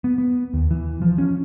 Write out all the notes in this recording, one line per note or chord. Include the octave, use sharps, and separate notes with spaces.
B3
B3
D#2
E3
F3
C#4